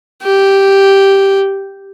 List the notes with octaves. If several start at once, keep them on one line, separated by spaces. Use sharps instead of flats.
G4